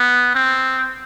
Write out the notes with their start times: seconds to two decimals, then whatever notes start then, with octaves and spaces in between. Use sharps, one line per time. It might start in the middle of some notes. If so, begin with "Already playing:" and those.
Already playing: B3
0.35 C4